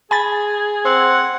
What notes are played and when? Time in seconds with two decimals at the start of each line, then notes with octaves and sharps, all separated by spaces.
0.11 G#4 G#5 B5 A6
0.85 C4 F#5